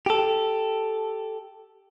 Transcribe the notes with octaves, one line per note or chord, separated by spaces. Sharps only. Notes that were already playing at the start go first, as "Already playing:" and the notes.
G4 A4